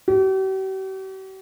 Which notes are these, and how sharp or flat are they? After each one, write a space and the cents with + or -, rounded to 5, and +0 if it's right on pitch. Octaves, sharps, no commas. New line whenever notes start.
G4 -45